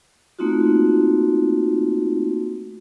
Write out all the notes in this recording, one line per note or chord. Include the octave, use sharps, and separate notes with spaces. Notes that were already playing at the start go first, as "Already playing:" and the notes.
A3 A#3 C4 D#4 F4 F#4